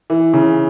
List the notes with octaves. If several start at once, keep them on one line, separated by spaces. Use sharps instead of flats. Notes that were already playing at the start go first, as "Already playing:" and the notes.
E3
C#3